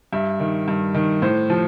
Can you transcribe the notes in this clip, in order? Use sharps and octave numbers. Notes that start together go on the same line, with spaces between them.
G2 E5
D#3
G2
D#3
A2 C5
F3